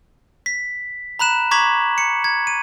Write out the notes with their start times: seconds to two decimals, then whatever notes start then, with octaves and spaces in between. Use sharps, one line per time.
0.46 B6
1.19 A#5 B5 F#6 E7
1.51 A#5 C#6 D6 G#6 B6 F#7
1.98 C#7
2.24 G#6
2.47 D#7